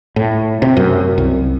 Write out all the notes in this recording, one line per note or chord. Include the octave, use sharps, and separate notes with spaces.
A2
C3
F#2
C2